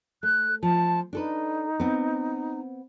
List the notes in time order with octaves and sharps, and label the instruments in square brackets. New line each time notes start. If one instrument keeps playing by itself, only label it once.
[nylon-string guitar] A3 [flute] F#6
[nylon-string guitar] F3 [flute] A5
[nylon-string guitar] D4 A4 B4 [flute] D#4
[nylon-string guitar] B3 C4